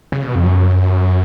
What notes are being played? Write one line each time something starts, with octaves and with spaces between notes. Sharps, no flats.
C#3
B2
F2
F#2